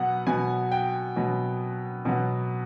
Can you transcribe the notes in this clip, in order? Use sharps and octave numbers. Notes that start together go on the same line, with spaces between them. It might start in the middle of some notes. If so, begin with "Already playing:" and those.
Already playing: B2 F#3 B3 F#5
B2 F#3 B3 G#5
G5
B2 F#3 B3
B2 F#3 B3